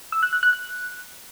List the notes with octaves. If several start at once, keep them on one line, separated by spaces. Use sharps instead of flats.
E6
F#6
F#6
F#6
F#6